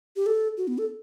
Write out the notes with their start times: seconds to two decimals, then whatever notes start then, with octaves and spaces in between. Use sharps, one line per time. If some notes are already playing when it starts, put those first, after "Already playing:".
0.16 G4
0.26 A4
0.57 F#4
0.68 B3
0.78 A4